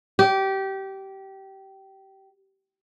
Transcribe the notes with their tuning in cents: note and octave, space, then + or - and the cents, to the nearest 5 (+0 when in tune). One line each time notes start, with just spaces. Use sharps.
G4 -20